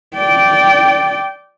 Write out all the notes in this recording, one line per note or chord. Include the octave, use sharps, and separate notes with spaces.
D5 G5